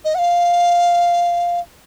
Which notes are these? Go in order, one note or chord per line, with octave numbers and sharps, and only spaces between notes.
D#5
F#5
F5